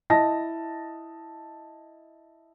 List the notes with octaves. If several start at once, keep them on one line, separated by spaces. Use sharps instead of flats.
E4 D#5 A5 A#6